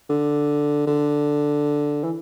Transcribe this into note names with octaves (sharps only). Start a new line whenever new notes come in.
D3
D3
E3